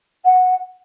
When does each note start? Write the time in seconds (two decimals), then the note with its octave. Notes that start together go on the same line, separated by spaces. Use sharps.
0.25 F#5